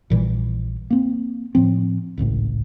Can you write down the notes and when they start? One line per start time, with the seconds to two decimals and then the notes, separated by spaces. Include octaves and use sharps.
0.10 A#1 A#2 E3 G3
0.90 A#3 C4
1.55 A2 F3 C4
2.17 D1 G#1 C#2 A2